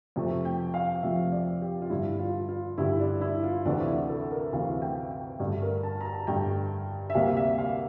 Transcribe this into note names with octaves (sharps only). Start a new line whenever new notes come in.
F2 C3 F3 A3
G5
F5
F2 C3 F3 A3 E5
D5
G4
F4
G2 D3 G3 E4
F4
F4
G2 D3 G3 E4
D4
E4
F4
D2 C3 E3 A3 D4
E4
A4
A#4
D2 C3 E3 A3 F5
G5
G5
G2 D3 A3
A#4
A5
A#5
A5
G2 D3 A3 G5
E5
D2 C3 G3 A#3 F5
E5
F5